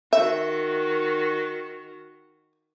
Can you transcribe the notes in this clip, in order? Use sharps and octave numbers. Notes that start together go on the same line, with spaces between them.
D#3 F#4 E5